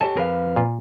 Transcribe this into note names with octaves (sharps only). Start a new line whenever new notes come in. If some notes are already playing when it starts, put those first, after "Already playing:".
G4 A4 C#5 D#5 G#5 A5
F2 G#4 A#4 B4 F5
A#2 F4